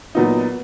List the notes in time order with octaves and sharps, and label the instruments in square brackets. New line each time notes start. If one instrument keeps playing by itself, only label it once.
[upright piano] A#2 F#3 B3 D#4